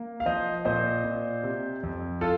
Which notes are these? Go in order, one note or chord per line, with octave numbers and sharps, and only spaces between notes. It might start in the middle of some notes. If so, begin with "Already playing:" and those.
Already playing: A#3
F5
F3 C5 D#5
A#2 C5 D#5
A#2
C3
F2
F4 A4